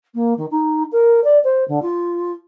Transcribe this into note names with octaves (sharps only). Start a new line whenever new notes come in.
A#3
D#3
D#4
A#4
D5
C5
D3
F4